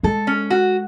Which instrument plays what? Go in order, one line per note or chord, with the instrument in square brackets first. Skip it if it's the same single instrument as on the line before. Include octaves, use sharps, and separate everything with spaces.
[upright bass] G#3 [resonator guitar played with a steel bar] A4
[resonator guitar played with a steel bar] C#4
F#4